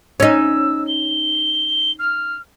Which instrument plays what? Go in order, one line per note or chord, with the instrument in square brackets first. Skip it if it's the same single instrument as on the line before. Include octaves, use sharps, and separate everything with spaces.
[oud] C#4 D#4 [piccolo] E6
[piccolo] G7
F6